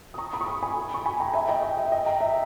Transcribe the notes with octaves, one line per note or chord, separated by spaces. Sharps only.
D#6
A#5 C#6
B5 D#6
C#6
B5 D#6
G#5 B5
C#6
G#5 B5
G5 A#5
E5 G#5
D#5 G5
D#5
E5
D#5 G5
G5 A#5
E5